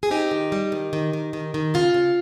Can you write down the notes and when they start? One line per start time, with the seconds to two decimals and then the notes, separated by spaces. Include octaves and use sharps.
0.03 G#4
0.10 C4 D#4 G4
0.31 D#3
0.52 G3
0.72 D#3
0.93 D#3
1.13 D#3
1.33 D#3
1.54 D#3
1.74 C#3 F4
1.94 C#3